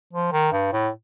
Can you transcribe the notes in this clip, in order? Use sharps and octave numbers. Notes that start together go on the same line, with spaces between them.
F3
D#3
G2
A2